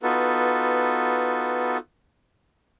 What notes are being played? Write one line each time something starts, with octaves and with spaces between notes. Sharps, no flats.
B3 D#4 F4 F#4 A4 B4